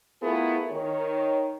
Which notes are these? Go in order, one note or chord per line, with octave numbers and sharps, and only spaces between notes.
A3 B3 E4 F4 G#4 A#4
D#3 C#5